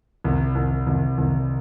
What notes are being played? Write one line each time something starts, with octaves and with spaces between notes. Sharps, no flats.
C2
C2
C2
C2